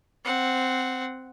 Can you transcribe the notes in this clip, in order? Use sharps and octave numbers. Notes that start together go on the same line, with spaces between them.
C4 F#5